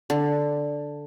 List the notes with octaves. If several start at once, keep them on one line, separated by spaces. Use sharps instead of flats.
D3